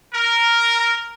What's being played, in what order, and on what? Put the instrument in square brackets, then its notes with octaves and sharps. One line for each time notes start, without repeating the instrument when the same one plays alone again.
[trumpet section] A#4